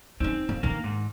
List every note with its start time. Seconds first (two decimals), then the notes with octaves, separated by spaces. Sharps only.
0.20 C4 C#4 D#4
0.49 A#3
0.63 D#3 A#3 D4
0.84 G#2